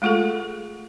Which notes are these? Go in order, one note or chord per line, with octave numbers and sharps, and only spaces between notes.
G#3 A3 F4 G#4 A4